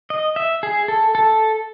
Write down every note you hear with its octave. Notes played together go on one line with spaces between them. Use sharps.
D#5
E5
G#4
A4
A4